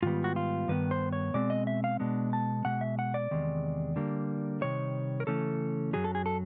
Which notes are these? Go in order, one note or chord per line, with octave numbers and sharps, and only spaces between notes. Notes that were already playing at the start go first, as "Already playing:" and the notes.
G#2 D#3 G3 B3 F4
F#4
F4
G2 D#3 B3 B4
C5
C#5
B2 G#3 C4 D5
D#5
E5
F5
B2 G#3 B3 D4
A5
B2 G#3 F#5
E5
F#5
D5
E2 C3 D#3 G#3
D3 G3 A#3
C3 D#3 G3 C#5
A#4
C#3 E3 A3 C#4 A4
F#2 C#3 F#3 G#4
A4
G#4
A4